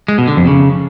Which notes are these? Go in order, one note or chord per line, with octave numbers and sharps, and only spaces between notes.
G#3
B2
D3
F2
C#3